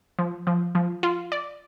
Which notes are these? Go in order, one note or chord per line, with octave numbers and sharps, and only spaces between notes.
F3
F3
F3
F4
D5